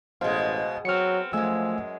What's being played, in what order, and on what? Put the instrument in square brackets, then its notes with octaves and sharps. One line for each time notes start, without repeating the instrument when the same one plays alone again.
[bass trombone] A1 [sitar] B2 G#3 [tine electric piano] C5 F5
[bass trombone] F#3 [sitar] B3 C4 [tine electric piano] F6 C#7
[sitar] F#2 G#3 [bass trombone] F3 [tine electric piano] A3 G#5 E6